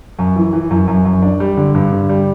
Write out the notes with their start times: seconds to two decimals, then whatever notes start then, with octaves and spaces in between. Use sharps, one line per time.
0.19 F#2
0.36 E3
0.53 E3
0.71 F#2
0.88 F#2
1.05 F#2
1.22 D4
1.40 G3
1.57 D3
1.75 G2
1.92 D3
2.09 G3